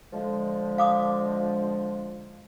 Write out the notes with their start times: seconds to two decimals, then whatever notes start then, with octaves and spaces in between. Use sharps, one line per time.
0.13 D3 F3 G#3
0.78 F5 D6 D#6